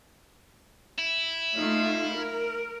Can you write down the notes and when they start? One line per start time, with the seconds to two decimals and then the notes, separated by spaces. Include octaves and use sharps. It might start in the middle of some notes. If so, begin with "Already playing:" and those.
0.98 E4
1.55 A3 D#4 F4
2.13 A#4